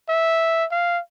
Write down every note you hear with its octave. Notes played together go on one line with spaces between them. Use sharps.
E5
F5